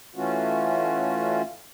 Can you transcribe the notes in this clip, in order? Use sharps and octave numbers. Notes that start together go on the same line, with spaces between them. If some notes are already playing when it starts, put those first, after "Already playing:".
E3 A3 C#4 F4 F#4